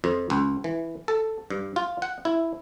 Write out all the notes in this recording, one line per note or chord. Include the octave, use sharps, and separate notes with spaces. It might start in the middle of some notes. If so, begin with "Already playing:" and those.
F2
C#2
E3
A4
G2
F4
F#5
E4